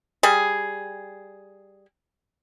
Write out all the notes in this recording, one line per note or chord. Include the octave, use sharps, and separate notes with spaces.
G3 G#4